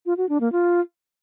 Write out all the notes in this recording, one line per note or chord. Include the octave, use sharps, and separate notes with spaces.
F4
F#4
D4
A#3
F4